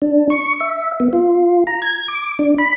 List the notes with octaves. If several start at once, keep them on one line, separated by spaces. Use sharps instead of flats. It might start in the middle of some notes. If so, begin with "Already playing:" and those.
D4
C#6
E5
B3
F4
A#5
G#6
D6
D4
B5